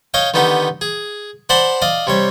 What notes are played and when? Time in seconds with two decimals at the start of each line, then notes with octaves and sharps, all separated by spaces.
0.14 C#5 D#5 F5 G5
0.34 D3 D#3 B3 D#4 G4
0.81 G#4
1.49 C5 D5 F#5 A5 B5 C6
1.82 D5 D#5 F5
2.07 C3 G3 C#5